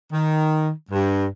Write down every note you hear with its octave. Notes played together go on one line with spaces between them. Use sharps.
D#3
G2